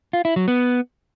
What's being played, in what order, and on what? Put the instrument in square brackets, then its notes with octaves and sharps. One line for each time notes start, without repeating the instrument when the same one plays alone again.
[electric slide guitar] F4
E4
F#3
B3